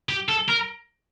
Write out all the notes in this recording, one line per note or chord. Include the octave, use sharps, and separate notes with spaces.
G4
A4
A#4